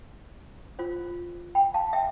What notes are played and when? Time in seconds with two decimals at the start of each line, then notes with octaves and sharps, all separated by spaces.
0.79 F4 C5
1.55 G5 B5
1.74 F5 A5
1.93 E5 G5